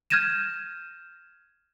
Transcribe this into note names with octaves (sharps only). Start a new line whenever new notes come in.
F6 G6 G#6 A#6 D#7 E7